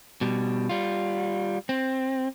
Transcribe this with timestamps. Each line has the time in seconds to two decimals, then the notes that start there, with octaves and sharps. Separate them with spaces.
0.21 B2 G3
0.69 G3 F4
1.69 C4